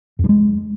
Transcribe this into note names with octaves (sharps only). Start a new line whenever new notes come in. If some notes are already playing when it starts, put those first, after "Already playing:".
F2
G2
G#3